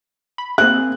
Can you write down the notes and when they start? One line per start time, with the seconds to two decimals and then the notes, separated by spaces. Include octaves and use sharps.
0.38 B5
0.58 A#3 C4 G#4 F#6